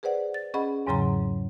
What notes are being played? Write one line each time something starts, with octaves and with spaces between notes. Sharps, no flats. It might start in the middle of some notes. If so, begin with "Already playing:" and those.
G#4 B4 C5 D5 F#5
A6
C#4 G#4 D#5 F#5 B5
E2 G#2 C#3 F#3 A#5 C6